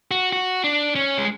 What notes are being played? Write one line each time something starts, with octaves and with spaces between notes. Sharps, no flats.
F#4
F#4
D4
C#4
G#3